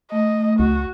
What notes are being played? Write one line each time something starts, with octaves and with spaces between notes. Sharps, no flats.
A3 D#5
C#2 F#4